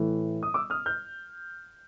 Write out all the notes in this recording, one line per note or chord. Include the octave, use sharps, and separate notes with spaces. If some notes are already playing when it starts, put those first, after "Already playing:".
Already playing: A2 E3 A3
D#6
D6 E6
D#6 F6
F6 G6